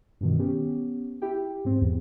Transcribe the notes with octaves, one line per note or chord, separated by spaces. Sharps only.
G2 B2 D#3
B3 C#4 G4
E4 G4 G5
G#2 C4
E2